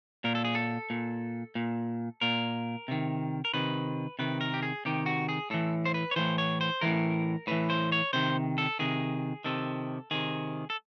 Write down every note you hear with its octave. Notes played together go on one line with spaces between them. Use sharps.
A#2 A#4
A4
G#4
A4
A#2
A#2
A#2 A#4
C3 D#3
A#4
C3 D#3 B4
C3 D#3 B4
A#4
G4
G#4
C3 D#3 G4
F#4
G#4
A2 E3 A4
C5
B4
C#5
A2 E3 C5
C#5
C5
A2 E3 A#4
A2 E3 B4
C5
C#5
C3 D#3 C5
A4
C3 D#3 G#4
C3 D#3 A4
C3 D#3 G#4
A4